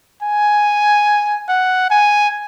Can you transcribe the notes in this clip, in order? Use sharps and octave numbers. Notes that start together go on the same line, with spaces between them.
G#5
F#5
G#5